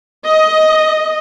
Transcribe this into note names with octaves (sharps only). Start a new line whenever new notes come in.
D#5